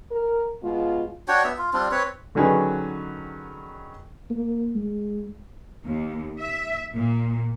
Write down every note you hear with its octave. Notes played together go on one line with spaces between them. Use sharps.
A#4
B2 G#3 F4
D4 F#4 C#5 G5
B3 E5
F4
G3 C4 D4 F4
C4 B4 C#5
D3 D#3 F#3 C#4 G#4 B4
A#3
G#3
D#2
E5
A#2